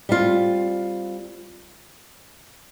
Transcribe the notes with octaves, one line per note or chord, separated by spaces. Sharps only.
G3 C4 F4